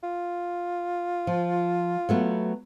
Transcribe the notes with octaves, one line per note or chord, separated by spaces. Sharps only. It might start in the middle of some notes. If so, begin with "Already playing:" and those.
F4
F3
F#3 A3 B3